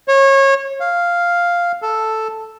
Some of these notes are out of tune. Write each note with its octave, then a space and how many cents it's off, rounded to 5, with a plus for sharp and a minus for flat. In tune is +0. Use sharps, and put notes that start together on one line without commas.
C#5 -25
F5 +0
A4 +0